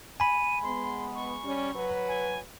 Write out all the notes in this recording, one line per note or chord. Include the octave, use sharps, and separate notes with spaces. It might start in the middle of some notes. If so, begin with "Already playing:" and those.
G#5 B5 D#7
G#3 B3 C6
C#6
G3 C#4
F#3 B4
G#5